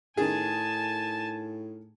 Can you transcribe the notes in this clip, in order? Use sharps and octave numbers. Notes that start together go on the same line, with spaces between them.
A2 D#3 G#4 G#5 A5